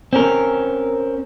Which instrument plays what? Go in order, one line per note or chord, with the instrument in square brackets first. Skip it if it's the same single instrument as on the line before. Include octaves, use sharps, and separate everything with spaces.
[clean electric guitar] C4 C#4 A#4